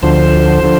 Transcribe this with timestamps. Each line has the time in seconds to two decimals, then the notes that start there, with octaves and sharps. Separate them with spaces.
0.03 D2 D3 F3 C5
0.63 D3 F3